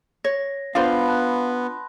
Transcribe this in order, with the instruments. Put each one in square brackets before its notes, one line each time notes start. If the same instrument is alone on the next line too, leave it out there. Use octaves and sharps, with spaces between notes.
[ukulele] C#5 [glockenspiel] A#6
[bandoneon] B3 [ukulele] D4 F4 C5 [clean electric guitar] F5 [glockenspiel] A5 B5 C6
[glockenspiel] A5 F#6